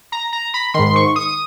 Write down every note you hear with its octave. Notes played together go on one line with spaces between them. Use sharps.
A#5
A#5
B5
G#2 D#3 C6
C6
C#6
D#6